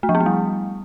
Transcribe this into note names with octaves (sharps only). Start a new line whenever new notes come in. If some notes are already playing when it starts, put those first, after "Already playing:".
A3
F3
B3
A3
G3